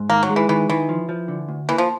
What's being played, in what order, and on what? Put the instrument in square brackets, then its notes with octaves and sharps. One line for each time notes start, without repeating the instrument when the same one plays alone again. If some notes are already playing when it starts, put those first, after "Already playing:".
Already playing: [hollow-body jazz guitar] G#2
[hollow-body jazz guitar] D#3 [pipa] A#3
[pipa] F#3
[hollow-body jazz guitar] G#3
[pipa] E3
[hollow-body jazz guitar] D#3 [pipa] E3
[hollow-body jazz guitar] D#3 [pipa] E3
[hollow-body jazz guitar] F3
F3
D3
D2
[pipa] E3 [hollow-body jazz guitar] A#3
[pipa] F3